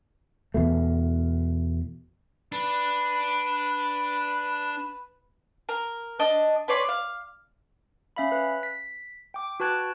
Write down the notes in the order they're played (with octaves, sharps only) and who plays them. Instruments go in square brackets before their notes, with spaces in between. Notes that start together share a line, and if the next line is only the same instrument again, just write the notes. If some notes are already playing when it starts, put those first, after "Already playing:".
[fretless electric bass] E2 B2 A3
[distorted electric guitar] D4 [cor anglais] B4
[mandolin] A#4
D4 D#5
B4 C#5 D5 C6
F5
[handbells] C#4 E5 F5 B5
B4
B6
G5 D6
F#4 B4 A5 F#6 G#6 D7